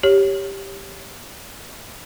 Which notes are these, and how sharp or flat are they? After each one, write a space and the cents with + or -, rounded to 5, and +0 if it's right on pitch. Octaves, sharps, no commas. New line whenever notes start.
G4 +0 C#5 +0